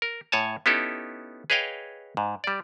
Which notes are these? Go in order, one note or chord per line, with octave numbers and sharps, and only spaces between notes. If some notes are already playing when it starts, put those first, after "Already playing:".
A#4
A2 C#5 G#5 A5
B3 C#4 D#4 E4 G4 A4
G#4 B4 C#5 D#5 F5 G5
G#2
G3 D5